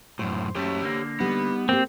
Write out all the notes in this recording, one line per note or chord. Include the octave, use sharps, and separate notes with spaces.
F#2 A2 C5
F#2 A3 G4 C#5
D3 A#3
G3 B3 D#4
A#3 C4 G4